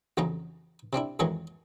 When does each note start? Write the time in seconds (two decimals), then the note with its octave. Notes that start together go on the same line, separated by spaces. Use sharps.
0.17 A1 F2 C#3 F#3 D#4 A#5
0.93 C3 C4 D4 E4
1.19 F2 D#3 E3 F#3 G#3 C#6